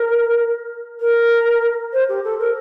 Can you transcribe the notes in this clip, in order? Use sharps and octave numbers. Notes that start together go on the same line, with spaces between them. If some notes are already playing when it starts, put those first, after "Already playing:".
Already playing: A#4
A#4
C5
G4
A4
A#4